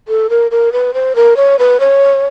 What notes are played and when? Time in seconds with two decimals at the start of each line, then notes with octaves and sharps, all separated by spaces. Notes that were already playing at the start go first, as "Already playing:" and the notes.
0.08 A4
0.30 A#4
0.51 A#4
0.72 B4
0.94 C5
1.16 A#4
1.36 C#5
1.59 B4
1.80 C#5